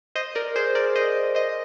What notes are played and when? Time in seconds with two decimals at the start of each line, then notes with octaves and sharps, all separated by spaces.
0.15 C5 D#5
0.35 A#4 D5
0.55 G#4 C5
0.75 A#4 D5
0.96 C5 D#5
1.35 C5 D#5